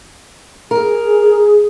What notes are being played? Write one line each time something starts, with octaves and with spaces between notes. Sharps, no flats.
G#4 A#4